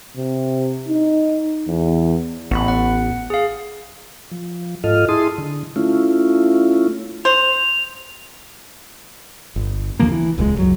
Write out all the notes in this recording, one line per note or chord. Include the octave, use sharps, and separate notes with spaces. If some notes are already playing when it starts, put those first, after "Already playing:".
C3
D#4
E2
A1 B3 B5
F#5
G#4 F5
F3
G#2 F4 A4 D#5 F6
E4 G#4 A5 C6 D#6
D3
A3 C#4 E4 F4
C5 F7
G1
D#2 D3 F3 A#3
E3
D#1 C#2 D#3 G#3
C#2 F#2 F#3